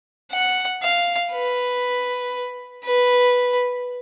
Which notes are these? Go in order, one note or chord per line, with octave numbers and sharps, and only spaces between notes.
F#5
F5
B4
B4